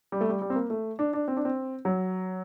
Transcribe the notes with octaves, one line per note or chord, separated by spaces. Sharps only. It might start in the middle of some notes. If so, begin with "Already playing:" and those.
G3
A3
G3
G3
C4
A#3
A3
D4
D4
C4
D4
C4
F#3